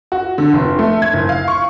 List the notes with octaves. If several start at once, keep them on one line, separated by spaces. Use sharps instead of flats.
F#4
D3
F1
A3
G#6
F#1
F5
C#6